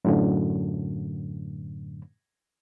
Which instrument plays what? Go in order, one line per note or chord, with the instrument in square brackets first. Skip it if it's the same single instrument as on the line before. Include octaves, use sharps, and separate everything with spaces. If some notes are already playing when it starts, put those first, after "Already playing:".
[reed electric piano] F#2 A2 D3